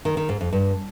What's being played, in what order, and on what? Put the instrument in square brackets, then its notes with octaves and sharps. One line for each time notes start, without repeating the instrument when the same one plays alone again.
[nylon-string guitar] D#3
D#3
G#2
F2
G2